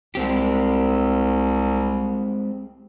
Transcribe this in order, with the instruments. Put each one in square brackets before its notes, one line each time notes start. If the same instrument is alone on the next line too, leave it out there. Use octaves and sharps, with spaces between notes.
[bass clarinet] C2 [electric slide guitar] G#3 C4 G4